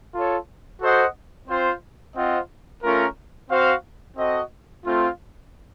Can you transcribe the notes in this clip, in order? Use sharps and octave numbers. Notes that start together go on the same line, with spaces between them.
F4 A4 C#5
F#4 A4 C5 D#5 F#5
C4 F4 C5
C4 F4 C5 D#5 F#5
A3 C#4 F4 A#4
C4 F#4 C5 F5
C4 F#4 A4 D#5
A3 C4 F4